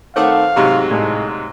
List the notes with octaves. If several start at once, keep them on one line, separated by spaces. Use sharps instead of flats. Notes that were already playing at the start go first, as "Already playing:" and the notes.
D#3 A3 C4 C#5 F5 F#5 D6
G#2 C3 F#3 G4 D#5 B5 C#6
A2 G#3 D5 A5